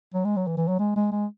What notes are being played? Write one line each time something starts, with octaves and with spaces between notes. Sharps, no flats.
F#3
G#3
F#3
E3
E3
F#3
G#3
G#3
G#3